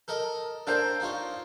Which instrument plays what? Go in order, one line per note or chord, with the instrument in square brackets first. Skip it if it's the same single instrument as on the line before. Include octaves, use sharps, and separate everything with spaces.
[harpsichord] A4 A#4 D#5
[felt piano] D4 A#4 C5 [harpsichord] A4 F5 G5
[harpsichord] D#4 F4 C#5